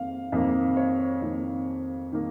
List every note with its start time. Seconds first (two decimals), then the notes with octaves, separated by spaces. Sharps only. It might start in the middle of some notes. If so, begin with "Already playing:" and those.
Already playing: F2 D#3 A#3 F5
0.32 F2 D#3 A#3
0.77 C#5
1.22 F2 D#3 A#3
2.12 D#3 A#3